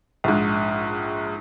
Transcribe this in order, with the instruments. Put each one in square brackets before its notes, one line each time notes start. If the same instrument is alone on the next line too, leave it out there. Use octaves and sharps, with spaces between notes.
[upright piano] A#1 G#2